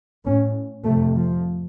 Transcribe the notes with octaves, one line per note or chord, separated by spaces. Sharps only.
A2 C#4
F2 C3 A3
F3